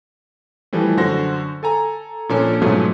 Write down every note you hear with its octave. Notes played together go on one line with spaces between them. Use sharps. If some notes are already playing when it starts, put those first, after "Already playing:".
E3 F3 G3 A3
F#2 D3 F#4 C5 A#6
A4 G#5 A#5
A#2 F3 A#3 C#4 D4 A4
G#2 B2 F3 F#3 A3 C#4